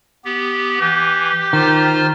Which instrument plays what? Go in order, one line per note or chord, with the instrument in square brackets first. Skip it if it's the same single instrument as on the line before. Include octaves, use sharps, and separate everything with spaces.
[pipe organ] B3 G4
[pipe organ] E3 [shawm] G4
[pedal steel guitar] D#3 [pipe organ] F4 C5 F6